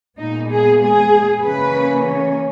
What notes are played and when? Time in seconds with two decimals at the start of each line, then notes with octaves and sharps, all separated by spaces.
0.18 A#2 G#3 B3 D#4
0.50 G#4
0.81 G#4
1.43 C#3 E3 A#3 C#4 B4
2.06 C#5